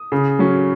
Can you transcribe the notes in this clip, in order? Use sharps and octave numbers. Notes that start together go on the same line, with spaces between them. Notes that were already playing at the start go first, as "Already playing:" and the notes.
Already playing: D#6
C#3
F#3 C#4